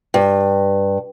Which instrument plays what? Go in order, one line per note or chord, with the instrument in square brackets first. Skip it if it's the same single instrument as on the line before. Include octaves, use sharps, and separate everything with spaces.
[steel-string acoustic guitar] G2